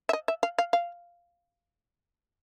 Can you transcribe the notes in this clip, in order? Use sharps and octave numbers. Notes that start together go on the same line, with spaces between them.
E5
D#5
E5
F5
F5
F5